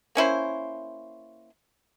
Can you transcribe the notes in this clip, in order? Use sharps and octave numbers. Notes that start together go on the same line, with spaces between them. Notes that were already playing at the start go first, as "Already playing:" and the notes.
A#3 C#4 E4 C5